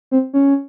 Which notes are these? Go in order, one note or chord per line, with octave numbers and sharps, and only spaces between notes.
C4
C#4